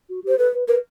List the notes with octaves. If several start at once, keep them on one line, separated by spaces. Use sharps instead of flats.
F#4
G4 C5
A4 B4
B4
A#4 B4